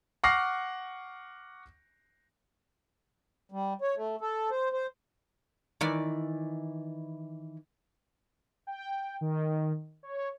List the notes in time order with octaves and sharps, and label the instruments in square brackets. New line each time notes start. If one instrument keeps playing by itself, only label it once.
[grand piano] F#5 C#6 D6 F6 A#6 C7
[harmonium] G3
C#5
A3
A4
C5
C5
[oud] D#3 E3 D5
[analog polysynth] G5
D#3
C#5